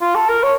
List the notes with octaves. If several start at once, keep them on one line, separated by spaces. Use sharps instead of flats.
F4
A4
A#4
C#5